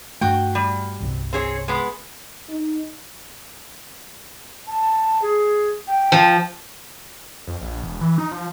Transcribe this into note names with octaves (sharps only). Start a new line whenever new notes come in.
G2 A3 F#4 G5
G3
G1 C2 C3
C4 G#4 C#5
G#3 B3
D#4
A5
G#4
G5
F3
F2
A#1
E1
E3
D#4
F3